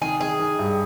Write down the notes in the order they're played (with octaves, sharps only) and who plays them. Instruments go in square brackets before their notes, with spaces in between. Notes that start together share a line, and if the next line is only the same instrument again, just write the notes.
[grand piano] D#3 [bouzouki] G#4
[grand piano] D#3 [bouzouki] G#4
[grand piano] D#3
G2